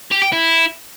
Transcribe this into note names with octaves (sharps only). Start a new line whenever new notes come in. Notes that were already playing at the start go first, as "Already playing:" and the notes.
G4
G5
E4